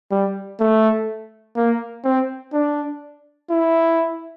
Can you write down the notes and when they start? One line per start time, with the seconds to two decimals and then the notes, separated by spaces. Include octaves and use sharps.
0.11 G3
0.60 A3
1.57 A#3
2.05 C4
2.53 D4
3.50 E4